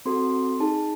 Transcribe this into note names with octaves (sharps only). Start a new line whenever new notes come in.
C4 F#4 A4 C6
D#4 G#4 A5